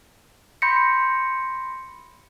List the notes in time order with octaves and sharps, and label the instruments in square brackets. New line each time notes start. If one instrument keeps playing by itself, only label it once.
[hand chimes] B5 C6 G6 A#6 B6 C#7